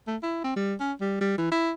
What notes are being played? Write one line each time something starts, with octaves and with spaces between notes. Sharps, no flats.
A3
E4
C4
G3
C#4
G3
G3
E3
E4